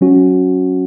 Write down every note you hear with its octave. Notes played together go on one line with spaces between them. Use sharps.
F#3 C#4 F#4